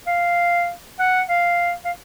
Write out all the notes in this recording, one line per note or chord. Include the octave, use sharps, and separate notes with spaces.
F5
F#5
F5
F5